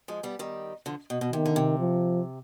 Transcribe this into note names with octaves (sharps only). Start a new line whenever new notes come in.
F3 G#3
G3 B3
D#3 G3
D3 F3
B2
B2
C3 D#3
D3
C3
F3